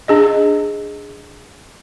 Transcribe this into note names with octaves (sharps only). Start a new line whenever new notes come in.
D4 G#4 D#5